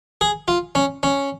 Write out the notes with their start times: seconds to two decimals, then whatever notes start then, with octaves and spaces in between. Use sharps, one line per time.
0.21 G#4
0.48 F4
0.75 C#4
1.03 C#4